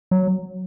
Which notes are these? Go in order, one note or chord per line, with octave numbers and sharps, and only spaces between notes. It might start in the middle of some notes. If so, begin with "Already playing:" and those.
F#3